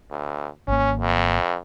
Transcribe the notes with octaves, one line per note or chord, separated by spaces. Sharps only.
D2
G#1 A#3 C#4
F2